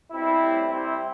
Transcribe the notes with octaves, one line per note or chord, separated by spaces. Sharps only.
B2 G3 C4 E4
A2 G3
C3 G3 C4 E4